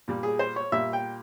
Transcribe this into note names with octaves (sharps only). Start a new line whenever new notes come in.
A#2 G3
G#4
C5
C#5
A#2 G3 E5
G5